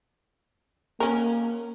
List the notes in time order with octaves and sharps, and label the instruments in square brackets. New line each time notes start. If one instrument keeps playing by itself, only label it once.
[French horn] A#3 [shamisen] C#4 A#4